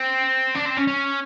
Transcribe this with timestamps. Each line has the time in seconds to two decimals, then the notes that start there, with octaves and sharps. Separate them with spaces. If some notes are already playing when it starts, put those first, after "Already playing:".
Already playing: C4
0.55 D4
0.66 C4
0.77 C#4
0.87 C#4